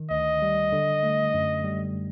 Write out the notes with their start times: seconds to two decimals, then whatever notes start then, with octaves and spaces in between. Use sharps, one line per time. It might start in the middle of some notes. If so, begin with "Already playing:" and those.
Already playing: D#3
0.11 D2 D#5
0.42 G3
0.72 D3
1.03 A3
1.34 F#2
1.64 G3